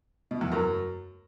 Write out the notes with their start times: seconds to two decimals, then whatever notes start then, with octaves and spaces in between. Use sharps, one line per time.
0.31 B2
0.41 E2
0.52 F#2